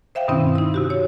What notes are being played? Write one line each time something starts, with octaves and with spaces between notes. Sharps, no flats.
C5 E5 F5 G5
G2 B2 D#3 C4 C#4 E4
D#4 E4
C3 F#4 G4
C#5